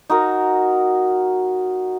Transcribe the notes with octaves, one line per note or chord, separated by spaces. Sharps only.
D#4 F#4 A#4